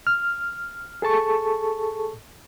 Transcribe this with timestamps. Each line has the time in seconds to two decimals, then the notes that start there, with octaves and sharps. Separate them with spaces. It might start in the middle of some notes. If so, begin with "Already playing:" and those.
0.07 F6
1.02 G#4 A4 A5 C#6